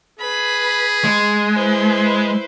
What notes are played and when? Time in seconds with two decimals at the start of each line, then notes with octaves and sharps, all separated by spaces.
0.19 G#4 B4 B5
1.05 G#3
1.54 E4 B4 C5